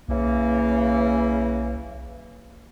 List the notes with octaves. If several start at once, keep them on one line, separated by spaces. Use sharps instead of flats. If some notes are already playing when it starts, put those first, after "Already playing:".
B1 C#3 E3 A#3